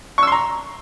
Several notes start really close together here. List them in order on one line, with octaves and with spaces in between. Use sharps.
C#6 E6 C6 A#5